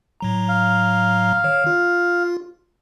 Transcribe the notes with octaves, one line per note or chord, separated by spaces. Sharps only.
A2 F#3 A#5
F5
D#3 C#5
F4